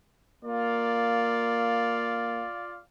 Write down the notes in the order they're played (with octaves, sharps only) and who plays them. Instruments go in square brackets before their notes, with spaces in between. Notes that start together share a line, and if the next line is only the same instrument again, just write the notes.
[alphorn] A#3 [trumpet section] F4 D5 F5